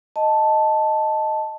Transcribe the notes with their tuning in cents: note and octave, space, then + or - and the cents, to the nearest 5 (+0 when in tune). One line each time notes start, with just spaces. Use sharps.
D#5 +0 A5 +0